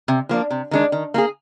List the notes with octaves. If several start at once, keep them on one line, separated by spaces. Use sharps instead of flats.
C3
F3 A#3 D4
C3
D#3 G#3 D4
D#3
A#3 F4 G#4